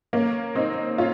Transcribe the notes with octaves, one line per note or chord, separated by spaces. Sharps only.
A#3 C#4
C4 D#4
C#4 F4